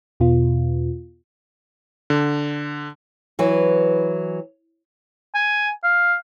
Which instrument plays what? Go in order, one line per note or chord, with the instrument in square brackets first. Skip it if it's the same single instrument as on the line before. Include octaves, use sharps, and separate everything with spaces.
[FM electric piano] E2 B2 B3 F4
[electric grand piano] D3
[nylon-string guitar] E3 F#3 B4
[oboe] G#5
F5